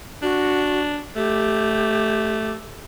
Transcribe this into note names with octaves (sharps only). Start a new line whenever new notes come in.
D4 F#4
A3 G4